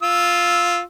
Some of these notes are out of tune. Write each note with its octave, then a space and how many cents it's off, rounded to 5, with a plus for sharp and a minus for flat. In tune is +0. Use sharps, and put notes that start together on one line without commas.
F4 +0 E6 -5